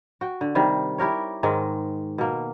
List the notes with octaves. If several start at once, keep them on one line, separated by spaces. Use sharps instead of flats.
F#4 G5
D3
C3 D#3 G3
E4 G4 A#4 C#5
G#2 D#3 G#3
B2 A#3